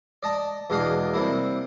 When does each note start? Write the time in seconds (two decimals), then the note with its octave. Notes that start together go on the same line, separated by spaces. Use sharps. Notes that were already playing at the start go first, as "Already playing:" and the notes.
0.23 D5 D#5 A5 A#5
0.70 E2 B2 G#3 D4 D#5 F5
1.14 C3 G3 A#3 E4